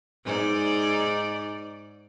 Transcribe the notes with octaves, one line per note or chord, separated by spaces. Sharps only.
G#2 D#4 D5